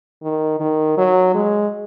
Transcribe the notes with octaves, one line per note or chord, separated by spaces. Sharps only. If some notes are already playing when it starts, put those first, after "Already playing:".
D#3
D#3
F#3
G#3